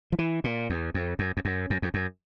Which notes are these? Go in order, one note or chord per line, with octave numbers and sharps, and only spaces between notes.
F3
E3
A#2
E2
F2
F#2
F2
F#2
F#2
F2
F#2